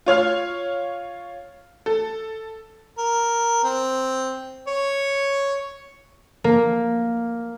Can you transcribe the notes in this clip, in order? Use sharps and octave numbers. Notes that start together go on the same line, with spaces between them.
F4 C#5 F5 F6
A4
A#4
C4
C#5
A#3